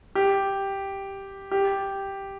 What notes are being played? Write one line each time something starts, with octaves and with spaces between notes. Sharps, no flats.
G4
G4